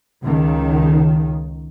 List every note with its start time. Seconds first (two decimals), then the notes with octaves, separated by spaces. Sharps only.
0.22 C#2 D#3